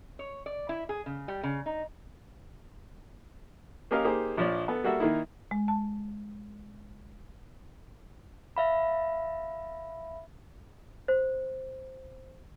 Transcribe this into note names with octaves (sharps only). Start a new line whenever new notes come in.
C#5
D5
E4
G#4
C#3
G3
C#3
D#4
A#3 C#4 G4 A#4 D#5 F5
A#3 D#4 G4 G#4 C5
A#1 F3 C#5 D5
B3 A4
G3 A#3 F#4 A4 E5
D#3 A#3 D#4 E4
G#3
A5
E5 F5 B5
C5